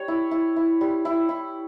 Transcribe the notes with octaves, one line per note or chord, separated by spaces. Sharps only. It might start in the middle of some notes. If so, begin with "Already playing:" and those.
Already playing: G3 C#5
E4
E4
E4
G3
E4
E4